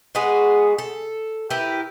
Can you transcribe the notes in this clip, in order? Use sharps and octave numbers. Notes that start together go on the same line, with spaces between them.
G#3 B3 F#4 G#4
A4
E4 G4 A#4 B4